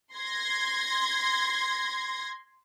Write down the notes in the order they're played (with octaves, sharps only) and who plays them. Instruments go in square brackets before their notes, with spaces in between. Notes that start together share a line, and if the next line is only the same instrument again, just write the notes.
[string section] C6 G#6 A#6